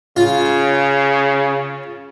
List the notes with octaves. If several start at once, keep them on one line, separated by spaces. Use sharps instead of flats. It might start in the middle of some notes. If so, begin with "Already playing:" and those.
C#3 F4